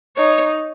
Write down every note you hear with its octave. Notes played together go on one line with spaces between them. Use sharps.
D#4 C#5